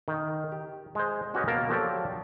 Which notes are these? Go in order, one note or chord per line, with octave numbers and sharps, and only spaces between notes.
D#3
G4
G#3 C5
C#4 F#4 G4 B4 C#5 D#5
B2 A#3 A#4 A5
F3 F#3 G4 A4 D5